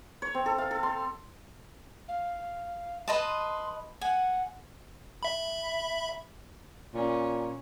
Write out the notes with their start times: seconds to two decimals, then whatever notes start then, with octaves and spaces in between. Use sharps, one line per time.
0.22 C#5
0.35 C4
0.46 A4
0.58 F5
0.71 A4
0.83 C6
2.08 F5
3.08 B4 D#5 A5 C6
4.01 F#5 G#5
5.23 E5 B5
6.94 A#2 C#4